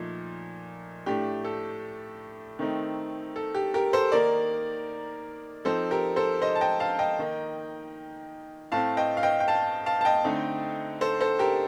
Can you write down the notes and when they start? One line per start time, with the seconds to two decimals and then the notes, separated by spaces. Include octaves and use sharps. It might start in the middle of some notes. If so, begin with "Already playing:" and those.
Already playing: A#2 F3 A3 D#4
1.06 A2 A3 D4 G4
1.44 A4
2.59 D#3 A3 C4 D#4
3.36 A4
3.54 G4
3.74 G4 A#4
3.93 A4 C5
4.12 D#3 A#3 D#4 A#4 D5
5.65 F3 C4 D#4 A4 C5
5.91 G4 A#4
6.16 A4 C5
6.42 C5 D#5
6.55 A5
6.61 D#5 G5
6.80 F5 A5
6.99 D#5 G5
7.19 D#3 A#3 D#4
8.72 A2 A3 C4 F5 A5
8.97 D#5 G5
9.17 F5
9.23 D#5 G5
9.40 G5
9.48 F5 A5
9.86 F5 A5
10.01 A5
10.05 D#5 G5
10.24 D3 A3 C4 D#4
11.01 A4 C5
11.20 A4 C5
11.39 G4 A#4